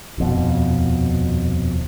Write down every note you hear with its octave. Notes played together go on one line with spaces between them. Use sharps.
D#1 F2 B2